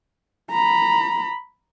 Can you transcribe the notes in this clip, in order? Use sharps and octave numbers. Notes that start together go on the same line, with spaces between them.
A#5 B5